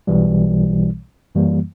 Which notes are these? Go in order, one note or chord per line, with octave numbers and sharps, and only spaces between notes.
B1 B2 E3 G3
F#2 E3 G3 A#3